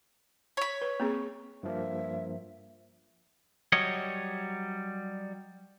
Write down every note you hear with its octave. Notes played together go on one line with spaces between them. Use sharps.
C#5 B5
B4
A#3 C4 G#4
G2 F3 A#3 E5
F#3 G3 C#5 D#5